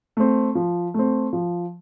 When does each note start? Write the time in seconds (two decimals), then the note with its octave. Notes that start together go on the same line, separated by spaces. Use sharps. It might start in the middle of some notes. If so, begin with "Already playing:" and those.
0.17 A3 C4
0.55 F3
0.94 A3 C4
1.33 F3